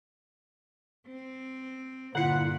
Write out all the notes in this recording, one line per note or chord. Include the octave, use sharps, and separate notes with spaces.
C4
G2 A#2 D3 E4 F4 F#5